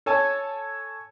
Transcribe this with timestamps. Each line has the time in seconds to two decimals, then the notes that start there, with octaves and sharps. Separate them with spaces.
0.06 A4 C#5 G#5 A5